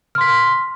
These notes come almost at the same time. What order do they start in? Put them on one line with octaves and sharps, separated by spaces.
F6 C6 B6